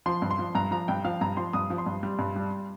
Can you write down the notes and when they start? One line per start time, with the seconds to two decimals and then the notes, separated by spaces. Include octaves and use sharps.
0.06 F3 C6
0.22 G2
0.31 C6
0.39 F3
0.55 G2 A#5
0.71 F3 A#5
0.88 G2 G5
1.05 F3 F5
1.21 G2 A#5
1.37 F3 C6
1.53 G2 D#6
1.70 F3
1.78 C6
1.86 G2
2.03 G3
2.19 G2
2.36 G3